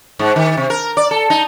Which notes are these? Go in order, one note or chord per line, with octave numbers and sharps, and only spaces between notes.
G#2
D#3
C3
A#4
D5
A4
D#4